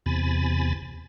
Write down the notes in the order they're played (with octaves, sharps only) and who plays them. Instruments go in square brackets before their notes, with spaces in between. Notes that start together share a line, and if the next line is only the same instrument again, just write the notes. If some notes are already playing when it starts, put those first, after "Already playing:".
[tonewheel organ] E2 C3 G#5 B5 A6